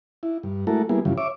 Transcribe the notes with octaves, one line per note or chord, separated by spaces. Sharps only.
E4
G2
G#3 A3 E4 F#4 A4 A#4
G3 A#3 B3 E4 G#4
F#2 C#3 E3 F3 G3
C#5 E5 D6